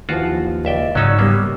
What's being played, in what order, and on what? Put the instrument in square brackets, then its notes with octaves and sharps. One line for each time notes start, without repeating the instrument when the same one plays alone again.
[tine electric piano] D#2 E3 F3 [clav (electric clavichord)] F4 F#4
[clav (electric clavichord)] C#2 E5 G5 [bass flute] D5
[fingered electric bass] G#2 C#3 [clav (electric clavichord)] F#3 C#4 D#4 [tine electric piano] C#5 E6
[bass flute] G3 [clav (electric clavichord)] A#3 B3